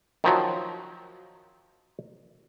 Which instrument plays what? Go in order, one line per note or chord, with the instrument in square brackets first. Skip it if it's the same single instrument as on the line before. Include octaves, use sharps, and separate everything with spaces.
[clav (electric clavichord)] D#3 F3 F#3